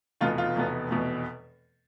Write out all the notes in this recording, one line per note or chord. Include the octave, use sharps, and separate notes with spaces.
F1 E2 B2 B3 F4
F4
F1 E2 B2 B3
F1 E2 B2 B3